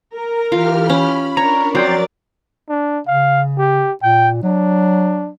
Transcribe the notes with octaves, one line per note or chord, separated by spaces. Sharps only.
A#4
E3 F4 G4 F6
C#4 B5
D4 A#4 C#5 A#5
F3 F#3 C4 A#4 D5 G5 C6 A6
D4
C#3 F5
G4
A#2 G5
F#3 D4